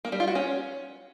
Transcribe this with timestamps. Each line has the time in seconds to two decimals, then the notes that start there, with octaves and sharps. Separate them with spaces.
0.05 A#3
0.12 G3
0.20 F4
0.28 F#4
0.35 C#4